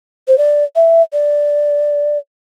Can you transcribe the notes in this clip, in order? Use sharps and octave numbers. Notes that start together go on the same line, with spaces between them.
C5
D5
E5
D5